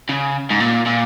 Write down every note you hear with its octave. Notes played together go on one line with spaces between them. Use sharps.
C#3
G#2
A#2
A#2